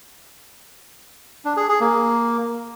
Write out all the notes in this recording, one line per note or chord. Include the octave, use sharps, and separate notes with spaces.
D4
G#4
G#4
A#3